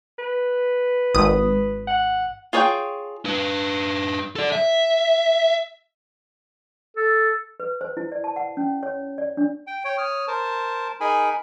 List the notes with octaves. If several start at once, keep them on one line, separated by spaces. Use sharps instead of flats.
B4
G#1 D#6
F#5
F4 G#4 C#5 D5 G5
D4 B4
A4 D5
E5
A4
B4
C5
E4
D5
A5
F#5
C#4
C#5
D5
D4
G5
C#5 G5
C#5 D#6 F6
A#4 C5 A5
D#4 G#4 A#4 G#5 B5